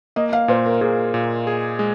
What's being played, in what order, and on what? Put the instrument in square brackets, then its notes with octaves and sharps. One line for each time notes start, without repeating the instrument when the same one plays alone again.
[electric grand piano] A#3 [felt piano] D#5
[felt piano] F5
[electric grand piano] A#2 [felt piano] C5
[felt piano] A#4
[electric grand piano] A#2 [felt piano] G#4
[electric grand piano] A#2
G#4
G#3